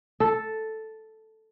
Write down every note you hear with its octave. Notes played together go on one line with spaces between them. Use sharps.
A4